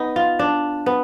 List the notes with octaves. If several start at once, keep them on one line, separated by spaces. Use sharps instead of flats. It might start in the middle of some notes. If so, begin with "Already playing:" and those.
Already playing: B3 D#4
F4
D4
B3